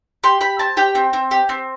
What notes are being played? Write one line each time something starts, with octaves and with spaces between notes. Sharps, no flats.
G4 C6
G4 B5
C4 A5
G4 G5
C4
C4
G4
C4